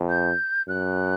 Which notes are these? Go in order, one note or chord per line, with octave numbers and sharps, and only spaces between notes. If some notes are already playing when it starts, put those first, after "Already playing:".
Already playing: F2
G6
F#2 F#6